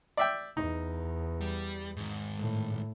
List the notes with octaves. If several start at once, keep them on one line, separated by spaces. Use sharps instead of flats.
D5 E5 G5
E2 D#4
G3
G#2 D#3
A2